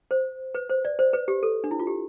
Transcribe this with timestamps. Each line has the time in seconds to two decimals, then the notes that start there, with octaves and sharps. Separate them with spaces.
0.11 C5
0.55 B4
0.69 C5
0.85 D5
0.99 C5
1.13 B4
1.28 G4
1.43 A4
1.64 D4
1.71 E4
1.79 F4
1.87 G4